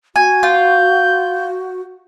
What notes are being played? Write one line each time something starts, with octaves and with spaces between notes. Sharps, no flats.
F#4 G#5
F4 G6